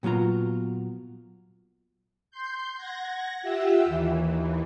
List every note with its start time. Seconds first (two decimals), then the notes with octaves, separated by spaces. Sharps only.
0.03 A#2 F#3 B3 F4 A#5
2.31 C6 G6
2.77 F#5 G#6 A#6
3.42 F4 G4 E5 F#5 E6
3.85 D#2 E3